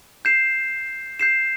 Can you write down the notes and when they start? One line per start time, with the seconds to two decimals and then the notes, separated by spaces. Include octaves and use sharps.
0.25 G6 C7 E7
1.20 G6 C7 E7